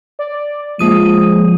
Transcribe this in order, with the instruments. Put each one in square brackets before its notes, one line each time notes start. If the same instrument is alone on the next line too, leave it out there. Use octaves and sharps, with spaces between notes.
[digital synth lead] D5
[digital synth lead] F3 [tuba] G#3 [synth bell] A#3 D#6 D#7